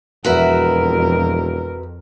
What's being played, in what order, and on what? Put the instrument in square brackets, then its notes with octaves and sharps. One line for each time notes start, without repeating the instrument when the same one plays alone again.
[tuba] E1 [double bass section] F2 [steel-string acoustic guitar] F#4 B4 E5 [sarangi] A#4